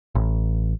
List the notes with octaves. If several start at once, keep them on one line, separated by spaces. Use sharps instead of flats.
A1